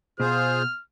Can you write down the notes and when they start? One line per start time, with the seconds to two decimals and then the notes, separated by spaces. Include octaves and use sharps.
0.20 B2 F4 G#4 C5 F6